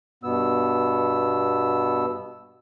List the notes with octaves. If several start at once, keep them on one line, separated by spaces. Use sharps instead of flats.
G2 B2 B3 E6